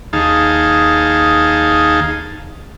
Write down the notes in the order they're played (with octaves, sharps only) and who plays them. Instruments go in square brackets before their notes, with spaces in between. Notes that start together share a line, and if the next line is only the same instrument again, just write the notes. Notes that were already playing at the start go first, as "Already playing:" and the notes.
[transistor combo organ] D#2 D#4 G#4 F5 A5